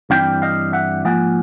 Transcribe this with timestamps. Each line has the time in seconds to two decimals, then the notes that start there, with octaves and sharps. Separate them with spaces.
0.10 G2 E3 G3 C4 E4 F5 G5
0.42 D#5 F5
0.73 E5 F#5
1.05 G#2 F3 A#3 F#5 G#5